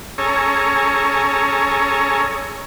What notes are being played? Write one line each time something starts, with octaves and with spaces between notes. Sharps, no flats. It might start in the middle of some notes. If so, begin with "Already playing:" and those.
C#4 G#4 A4 C#5 A#5